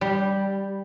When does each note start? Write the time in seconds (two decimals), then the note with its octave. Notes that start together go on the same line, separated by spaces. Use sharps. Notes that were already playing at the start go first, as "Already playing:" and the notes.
0.01 G3